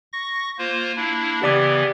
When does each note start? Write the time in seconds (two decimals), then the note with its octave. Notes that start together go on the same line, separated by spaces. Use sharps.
0.12 C#6 A#6
0.58 A#3 F4 C5
0.97 A#3 D4 E4
1.42 C#3 E3 B3 G4 D5 D6